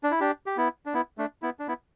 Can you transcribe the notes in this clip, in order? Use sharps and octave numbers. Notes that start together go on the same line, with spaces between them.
D4
E4
D4 G4
G4
B3 E4
D4
B3 E4
A3 D4
B3 E4
D4
B3 E4